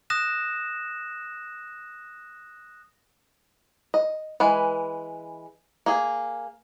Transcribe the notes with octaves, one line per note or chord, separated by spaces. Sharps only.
D#6 F#6 A#6 E7
D#5
E3 G#3 B4
A#3 G#4